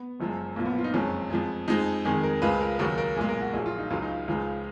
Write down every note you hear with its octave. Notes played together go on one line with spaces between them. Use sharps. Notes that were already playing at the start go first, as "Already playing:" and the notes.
Already playing: B3
F#1 F#2 F3 G#3
B1 A#2 F3 A#3
B3
F4
D#4
F#1 F2 F3 G#3 C#4
F2 F3 G#3
F2 F3 G#3 D#4
F2 D#3 G#3 G#4
A#4
C#2 C#3 F3 G#3 B4
A#4
D#2 C#3 F#3 A#4
A#4
B1 A#2 G#3 G#4
A#4
F#4
A#1 A#2 F#3 G#4
F4
D#4
C#2 C#3 F#3 F4
D#4
C#2 C#3 F3 G#3